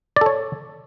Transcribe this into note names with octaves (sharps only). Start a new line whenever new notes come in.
A4 C#5 D5